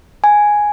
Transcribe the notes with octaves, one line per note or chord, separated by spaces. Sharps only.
G#5